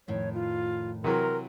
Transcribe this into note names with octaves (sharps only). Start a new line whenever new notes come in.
F2 A2 D#3 C#5
F4
C3 E3 F#3 A#4 C6